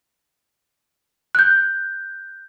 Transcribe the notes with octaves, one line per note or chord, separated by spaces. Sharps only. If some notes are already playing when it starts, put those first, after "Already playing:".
F#6 G6